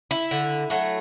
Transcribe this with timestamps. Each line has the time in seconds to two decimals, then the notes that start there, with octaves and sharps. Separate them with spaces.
0.11 E4
0.31 D3
0.70 F#3 A3